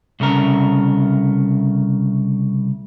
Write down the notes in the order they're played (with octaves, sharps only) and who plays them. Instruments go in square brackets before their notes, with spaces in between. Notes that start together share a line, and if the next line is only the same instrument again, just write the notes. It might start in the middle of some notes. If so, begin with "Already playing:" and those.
[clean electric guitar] C2 C#3 A3 A#4